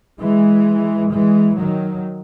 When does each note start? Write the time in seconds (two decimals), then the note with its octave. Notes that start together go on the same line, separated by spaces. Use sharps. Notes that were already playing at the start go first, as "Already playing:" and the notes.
0.21 E3 G#3
1.11 E3 G#3
1.56 D#3 F#3